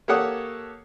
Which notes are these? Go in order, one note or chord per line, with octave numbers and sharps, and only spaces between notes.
A#3 G4 A4 C#5 F#5 D#6